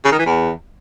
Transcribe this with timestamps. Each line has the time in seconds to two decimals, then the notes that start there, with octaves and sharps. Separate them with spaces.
0.04 C#3
0.12 D#3
0.19 E3
0.26 E2